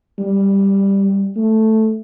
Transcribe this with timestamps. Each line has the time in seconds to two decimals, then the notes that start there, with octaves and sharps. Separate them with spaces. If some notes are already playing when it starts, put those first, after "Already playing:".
0.19 G3
1.36 A3